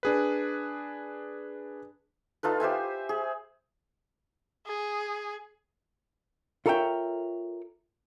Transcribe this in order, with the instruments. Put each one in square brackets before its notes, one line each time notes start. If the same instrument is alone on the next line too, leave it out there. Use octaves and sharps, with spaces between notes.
[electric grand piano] D4 G#4 B4
[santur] D#4 F4 A4 B4
G4 C5 E5 G#5
G#4
[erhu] G#4
[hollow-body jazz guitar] F4 A4 A#4 C#5 E5 G5